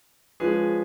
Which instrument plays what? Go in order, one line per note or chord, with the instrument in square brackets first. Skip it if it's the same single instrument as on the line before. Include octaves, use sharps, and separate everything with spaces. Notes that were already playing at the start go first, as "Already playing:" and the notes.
[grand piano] F3 G#3 C#4 G#4 B4